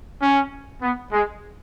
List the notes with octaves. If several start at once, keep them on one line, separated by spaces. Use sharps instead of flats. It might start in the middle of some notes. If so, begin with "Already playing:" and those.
C#4
B3
G#3